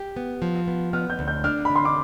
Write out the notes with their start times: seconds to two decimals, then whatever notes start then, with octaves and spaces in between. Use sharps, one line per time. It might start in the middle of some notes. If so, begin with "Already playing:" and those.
Already playing: G4
0.16 B3
0.42 F3
0.68 B3
0.93 B3 F6
1.10 G6
1.19 D2
1.28 G6
1.44 D4 F6
1.65 D3 B5
1.76 C6
1.85 D6